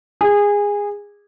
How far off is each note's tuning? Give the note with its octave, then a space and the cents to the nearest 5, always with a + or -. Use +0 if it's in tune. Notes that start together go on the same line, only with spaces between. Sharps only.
G#4 -20